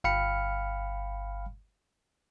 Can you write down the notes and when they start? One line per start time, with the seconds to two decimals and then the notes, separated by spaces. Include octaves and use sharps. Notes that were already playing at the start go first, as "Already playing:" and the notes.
0.04 G1 F5 G5 B5 F6 C#7